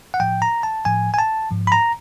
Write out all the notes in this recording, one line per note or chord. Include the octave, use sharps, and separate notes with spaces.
F#5
A2 F3 G5
A#5
A5
A2 F3 G#5
G#5
A5
G#2 F3
B5
A#5